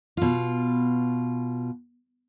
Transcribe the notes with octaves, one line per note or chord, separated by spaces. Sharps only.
B2 F4